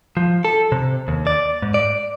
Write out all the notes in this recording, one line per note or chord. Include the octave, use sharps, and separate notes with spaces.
F3
A4
C3
D#2
D5
G#2
D5